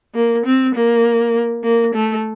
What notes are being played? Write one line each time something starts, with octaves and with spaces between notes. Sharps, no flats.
A#3
C4
A#3
A#3
A3